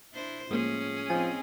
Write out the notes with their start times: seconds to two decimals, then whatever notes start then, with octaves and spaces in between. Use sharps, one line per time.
0.13 D4 E4 C5
0.51 A2 F3 G#3 A#3 C#4 G#4
1.10 F3 C4 D#4 G#5